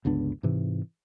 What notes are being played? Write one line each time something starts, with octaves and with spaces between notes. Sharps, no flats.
G1 C#2 B3 D4
G#2 C3 E3